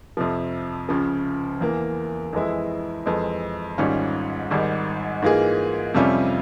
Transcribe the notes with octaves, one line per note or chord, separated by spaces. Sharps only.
F2 C3 F3
C#2 C#3 F3
E2 E3 A#3
F2 E3 G#3 E4
F2 E3 G#3
G#1 G#2 G3 C#4 F4
G#1 G#2 G3
G#2 E3 A#3 F4 G#4
F2 C3 G3 C#4 F4